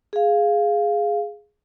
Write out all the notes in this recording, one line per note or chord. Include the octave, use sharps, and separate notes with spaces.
G#4 F5